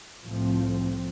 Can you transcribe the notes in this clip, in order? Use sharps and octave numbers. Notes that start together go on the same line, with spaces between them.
C2 A2 F3 A3 C4